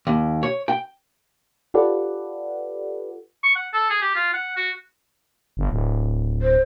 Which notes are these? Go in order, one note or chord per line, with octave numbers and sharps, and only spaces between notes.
D#2
C#5
G5
F4 G4 A4 B4 D5 F#5
C#6
F#5
A4
G#4
G4
F4
F#5
F#4
G1
D1
C5